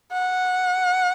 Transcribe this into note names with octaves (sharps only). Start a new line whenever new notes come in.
F#5